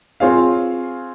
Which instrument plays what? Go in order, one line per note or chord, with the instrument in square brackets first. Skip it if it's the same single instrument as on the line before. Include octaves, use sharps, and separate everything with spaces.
[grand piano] C4 F4 G#4 C#5 F5